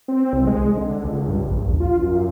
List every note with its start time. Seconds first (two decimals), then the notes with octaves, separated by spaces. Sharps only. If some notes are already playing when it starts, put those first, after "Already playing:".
0.08 C4
0.33 C2
0.47 G#3
0.76 D3
1.05 C#2
1.28 G2
1.48 A#1
1.69 E2
1.80 F4
2.00 F#2